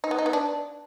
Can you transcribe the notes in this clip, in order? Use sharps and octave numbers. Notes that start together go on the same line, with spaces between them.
D#4
B3
D#4
B3
D4